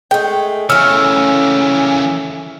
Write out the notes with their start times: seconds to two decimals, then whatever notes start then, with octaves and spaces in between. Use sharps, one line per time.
0.11 G#3 A3 G5
0.70 C#3 E3 A3 C#4 E6 F6